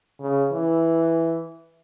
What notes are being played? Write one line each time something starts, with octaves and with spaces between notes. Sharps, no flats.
C#3
E3